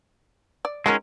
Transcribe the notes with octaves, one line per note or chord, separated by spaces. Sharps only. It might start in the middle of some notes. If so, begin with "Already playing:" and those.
D5
D#3 G#3 C#4 F#4 A#4